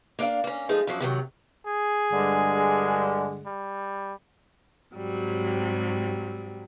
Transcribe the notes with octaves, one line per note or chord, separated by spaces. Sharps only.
A#3 D4 D5 D#5 F5
A#3 C#4
F3 G#3 A3 D#4
F#2 F3 F#3 D4
C3 D#3 F#3
G#4
G2 D3 G#3
G3
G#2 C3 F#3 G3